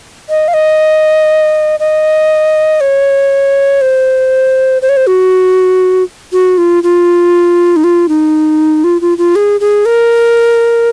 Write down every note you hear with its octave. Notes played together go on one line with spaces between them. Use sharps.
D#5
F5
D#5
D#5
C#5
C5
C5
C#5
C5
F#4
F#4
F4
F4
D#4
F4
D#4
F4
F4
F4
G#4
G#4
A#4